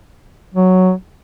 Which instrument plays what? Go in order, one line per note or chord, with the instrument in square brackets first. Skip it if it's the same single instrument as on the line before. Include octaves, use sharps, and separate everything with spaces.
[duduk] F#3